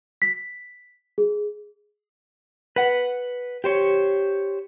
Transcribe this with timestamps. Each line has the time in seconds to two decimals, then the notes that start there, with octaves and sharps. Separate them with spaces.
0.22 B6
1.18 G#4
2.76 B4 F#5
3.64 G4 C5 C#5